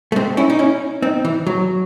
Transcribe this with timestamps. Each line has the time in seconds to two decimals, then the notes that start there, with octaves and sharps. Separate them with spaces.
0.12 A3
0.16 G#3 C4
0.37 C#4 E4
0.50 D#4
0.59 C#4 E4
1.02 C4 D#4
1.25 E3
1.47 F#3